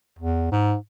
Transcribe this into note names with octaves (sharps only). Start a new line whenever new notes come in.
E2
G#2